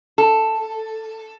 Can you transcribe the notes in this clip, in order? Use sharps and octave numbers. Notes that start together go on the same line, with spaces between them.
A4